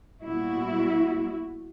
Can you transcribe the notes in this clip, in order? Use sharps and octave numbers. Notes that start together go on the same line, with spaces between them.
A#2 G3 B3 E4 F#4